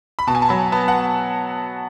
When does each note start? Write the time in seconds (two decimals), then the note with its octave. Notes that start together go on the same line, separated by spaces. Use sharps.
0.19 B5
0.27 B2 A5
0.35 G#5
0.42 A5
0.49 F#3 B5
0.72 B3 A5
0.88 F#5